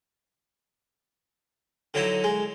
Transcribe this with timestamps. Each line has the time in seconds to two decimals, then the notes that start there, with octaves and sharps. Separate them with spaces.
1.94 D3 F#3 D#4 E4
2.24 G#3